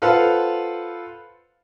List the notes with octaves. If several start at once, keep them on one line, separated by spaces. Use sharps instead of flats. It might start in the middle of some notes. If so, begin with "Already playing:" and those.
F4 A4 B4 C5 F5 F#5